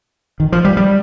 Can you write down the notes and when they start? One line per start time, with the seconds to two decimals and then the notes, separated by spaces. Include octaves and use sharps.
0.40 D#3
0.52 F3
0.65 G3
0.77 G3